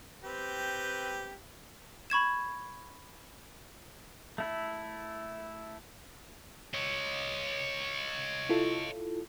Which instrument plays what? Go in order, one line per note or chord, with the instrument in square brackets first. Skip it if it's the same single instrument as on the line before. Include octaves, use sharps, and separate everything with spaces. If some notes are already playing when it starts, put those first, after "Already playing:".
[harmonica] C4 G4 B4
[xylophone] B5 C#6 G#6 E7
[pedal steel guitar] A3 E4
[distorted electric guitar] C#5 D#5
[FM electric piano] E4 F4 A4